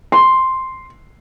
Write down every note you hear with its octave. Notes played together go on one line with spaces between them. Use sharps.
C6